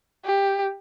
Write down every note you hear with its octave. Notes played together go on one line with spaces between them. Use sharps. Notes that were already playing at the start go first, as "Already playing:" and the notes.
G4